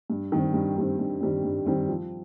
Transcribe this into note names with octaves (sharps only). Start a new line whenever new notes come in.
G2
D#3 G3 C4
G2
D#3 G3 C4
G2
D#3 G3 C4
G2
D#3 G3 C4
F3